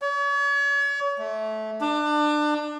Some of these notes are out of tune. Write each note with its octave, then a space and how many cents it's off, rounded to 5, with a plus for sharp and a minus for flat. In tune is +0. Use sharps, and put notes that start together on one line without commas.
C#5 +40
A3 -20
D4 +25